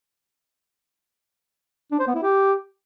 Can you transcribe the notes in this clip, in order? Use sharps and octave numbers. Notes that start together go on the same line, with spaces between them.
D4
C5
B3
E4
G4